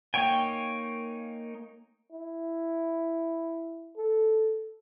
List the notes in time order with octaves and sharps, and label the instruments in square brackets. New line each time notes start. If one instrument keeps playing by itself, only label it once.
[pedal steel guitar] A#3 D#4 C#5 G5 G#5
[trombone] E4
A4